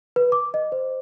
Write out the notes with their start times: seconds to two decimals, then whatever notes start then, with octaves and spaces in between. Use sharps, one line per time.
0.16 B4
0.32 D6
0.54 D#5
0.72 C5